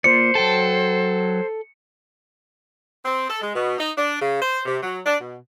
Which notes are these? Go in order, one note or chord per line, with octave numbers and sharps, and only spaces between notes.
A#3 F4 C5 D5 C#7
F#3 A4 G5 A5
C4
A4
G#3
B2
D#4
D4
C#3
C5
C3
F#3
D4
B2